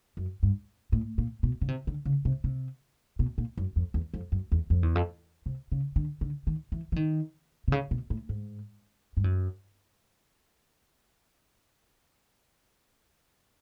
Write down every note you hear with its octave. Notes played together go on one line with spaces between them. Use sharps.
F#2
G2
A2
A#2
B2
C#3
C3
D3
C#3
C3
C3
B2
A#2
F#2
F2
E2
F2
F#2
E2
F2
E2
F2
C3
C#3
D3
D3
D#3
E3
E3
D#3
C3
C#3
B2
A2
G#2
G2
F#2